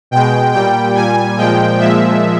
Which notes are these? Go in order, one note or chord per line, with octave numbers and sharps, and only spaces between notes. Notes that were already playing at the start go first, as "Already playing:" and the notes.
B2 G#3 G5
A#2 G3 G5
A#2 G3 G#5
A#2 F3 G#3 G5
A#2 F3 G#3 E5